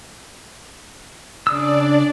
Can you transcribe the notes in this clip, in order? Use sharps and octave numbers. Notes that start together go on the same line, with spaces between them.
C#3 D4 D5 D#6 E6